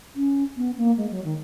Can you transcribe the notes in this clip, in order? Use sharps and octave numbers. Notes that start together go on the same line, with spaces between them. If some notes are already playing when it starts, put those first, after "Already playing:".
C#4
B3
A#3
G#3
F#3
D#3